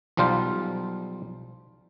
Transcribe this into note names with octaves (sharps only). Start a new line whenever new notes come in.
B1 F3 G3 F4 C5